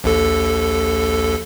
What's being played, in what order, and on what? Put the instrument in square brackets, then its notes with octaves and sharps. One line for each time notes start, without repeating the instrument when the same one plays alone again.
[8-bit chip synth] A#1 D#2 A4